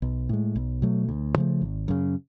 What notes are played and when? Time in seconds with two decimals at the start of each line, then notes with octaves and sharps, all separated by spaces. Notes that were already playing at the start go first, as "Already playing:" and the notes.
0.02 B1
0.29 A2 G#3
0.56 B1
0.82 B2 F#3 A3
1.08 D2
1.35 C#3 F3 A3
1.61 G#1
1.88 F#2 C#3